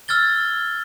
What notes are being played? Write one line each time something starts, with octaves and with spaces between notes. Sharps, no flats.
E6 F6 G#6 A6 G7